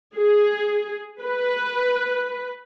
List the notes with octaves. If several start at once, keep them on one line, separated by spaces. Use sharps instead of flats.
G#4
B4